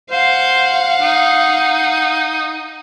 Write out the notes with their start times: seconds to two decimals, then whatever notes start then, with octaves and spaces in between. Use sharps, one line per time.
0.11 C5 F5 F#5
1.02 D#4